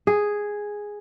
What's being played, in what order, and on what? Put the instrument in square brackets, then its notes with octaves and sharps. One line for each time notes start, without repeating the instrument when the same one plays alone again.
[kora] G#4